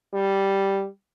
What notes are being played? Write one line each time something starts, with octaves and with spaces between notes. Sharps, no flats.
G3